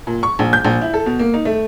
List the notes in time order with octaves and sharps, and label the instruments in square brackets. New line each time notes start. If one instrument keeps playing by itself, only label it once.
[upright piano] A#2
C#6
A#1
G6
A#1
E4
A4
B2
A#3
D#4
A3